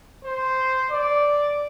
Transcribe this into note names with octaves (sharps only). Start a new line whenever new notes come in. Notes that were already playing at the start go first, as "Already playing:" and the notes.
C5
D5